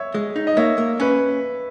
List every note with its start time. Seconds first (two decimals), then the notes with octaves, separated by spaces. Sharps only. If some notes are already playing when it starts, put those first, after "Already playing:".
Already playing: C#5 E5
0.14 G#3
0.36 D#4
0.47 D#5
0.57 A#3 C#5 E5
0.78 A#3
1.00 C#4 B4